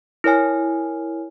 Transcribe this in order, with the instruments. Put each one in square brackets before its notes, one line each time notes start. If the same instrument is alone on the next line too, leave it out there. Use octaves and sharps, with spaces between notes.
[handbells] E4 A#4 C#5 G#5 F6